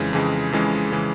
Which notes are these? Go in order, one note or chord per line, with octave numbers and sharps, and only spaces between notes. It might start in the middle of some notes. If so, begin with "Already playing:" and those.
Already playing: F2 C#3 E3 G#3
F2 C#3 E3 G#3
F2 C#3 E3 G#3
C#3 E3 G#3